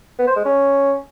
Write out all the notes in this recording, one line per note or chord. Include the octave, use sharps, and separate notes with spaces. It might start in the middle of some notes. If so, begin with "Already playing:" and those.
B3
C5
G#3
C#4